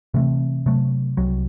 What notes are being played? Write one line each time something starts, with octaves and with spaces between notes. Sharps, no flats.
C3 E3 A3 C4
C3 F#3 A3
C2 C3 F#3